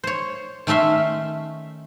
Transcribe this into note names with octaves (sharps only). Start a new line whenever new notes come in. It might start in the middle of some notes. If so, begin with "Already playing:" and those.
C5 C#5
D#3 A3 C#4 E5 C6